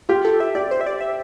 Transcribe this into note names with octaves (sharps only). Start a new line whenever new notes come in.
F4 G4
A4
E5
G4 D5
C5
E5
D5
E5